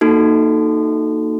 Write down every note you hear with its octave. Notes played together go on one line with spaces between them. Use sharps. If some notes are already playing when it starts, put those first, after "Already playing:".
A#3 D#4 F#4 A4